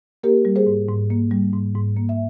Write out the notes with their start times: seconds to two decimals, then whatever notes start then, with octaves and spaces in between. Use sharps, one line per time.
0.23 A#3 G4 A#4
0.45 G3
0.56 G#4 C5
0.67 G#2
0.88 G#2
1.10 A#3
1.31 G3
1.53 G#2
1.75 G#2
1.97 A#3
2.09 E5